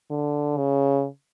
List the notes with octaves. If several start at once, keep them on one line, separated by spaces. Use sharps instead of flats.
D3
C#3